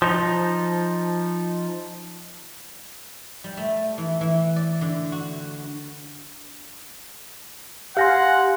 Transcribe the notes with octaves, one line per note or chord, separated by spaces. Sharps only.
F3 D#4
G3
A3
E3
E3
D5
D3
F#4
G4 F5 F#5 G#5 C6 A#6